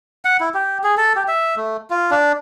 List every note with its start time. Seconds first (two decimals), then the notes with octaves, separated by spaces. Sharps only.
0.25 F#5
0.40 E4
0.54 G4
0.84 G#4
0.97 A4
1.16 G4
1.28 E5
1.56 A3
1.90 F4
2.11 D4